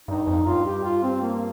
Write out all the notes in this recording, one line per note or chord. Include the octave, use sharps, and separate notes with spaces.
G2 D#4
F2
G2 F4
G4
F4
C4
A#3